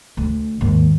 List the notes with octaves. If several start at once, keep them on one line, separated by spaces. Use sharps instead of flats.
D2
D#2 G#2